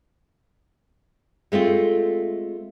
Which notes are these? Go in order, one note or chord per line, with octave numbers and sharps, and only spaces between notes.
G#3 A3 C4 F4